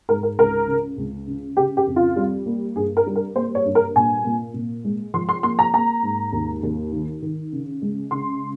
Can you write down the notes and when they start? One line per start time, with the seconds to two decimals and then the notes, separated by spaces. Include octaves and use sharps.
0.09 G#2 A#4
0.23 A#4
0.38 C#2 A#4
0.67 C#3
0.98 C#2
1.27 C#3
1.57 C#3 G4
1.77 G4
1.87 F2
1.96 F4
2.16 G3
2.46 A#3
2.76 G2 G#4
2.97 A#4
3.07 G3
3.16 A#4
3.35 A#3 C5
3.55 C#5
3.65 G2
3.75 A#4
3.95 A#2 G#5
4.25 A#2
4.54 A#2
4.85 G#3
5.14 F3 C6
5.29 C6
5.43 A#3 C6
5.59 A#5
5.74 A#3 A#5
6.03 G#2
6.33 D#2
6.63 D#2
6.92 D#3
7.22 D#3
7.52 C#3
7.82 G#3
8.11 C#3 C6